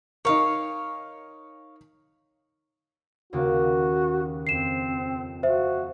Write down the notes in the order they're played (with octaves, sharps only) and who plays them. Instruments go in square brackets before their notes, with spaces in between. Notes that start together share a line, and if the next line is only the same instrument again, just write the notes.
[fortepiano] D#4 A#4 [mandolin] C#5 F5
[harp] D#2 C#3 A#3 [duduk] F#4
[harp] F2 [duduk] C4 [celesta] C7 E7
[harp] F3 [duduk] F#4 [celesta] C5 E5